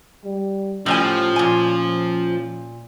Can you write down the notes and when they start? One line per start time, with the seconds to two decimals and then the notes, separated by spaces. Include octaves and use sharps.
0.25 G3
0.86 A2 F3 G3 C#4 G#5
1.36 A#2 G#5